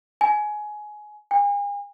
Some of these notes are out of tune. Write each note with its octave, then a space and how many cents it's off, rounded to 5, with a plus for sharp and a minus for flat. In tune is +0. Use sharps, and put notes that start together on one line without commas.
G#5 +15
G#5 -40